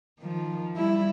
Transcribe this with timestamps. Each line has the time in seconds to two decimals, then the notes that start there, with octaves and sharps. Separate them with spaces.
0.19 D#3 F3
0.76 G3 E4